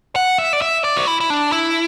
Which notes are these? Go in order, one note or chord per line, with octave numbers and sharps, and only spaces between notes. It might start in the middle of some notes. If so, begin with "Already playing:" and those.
F#5
E5
D5
E5
D5
F#4
E4
E4
D4
E4